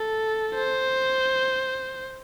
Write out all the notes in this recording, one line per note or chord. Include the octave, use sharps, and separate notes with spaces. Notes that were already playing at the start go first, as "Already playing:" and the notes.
Already playing: A4
C5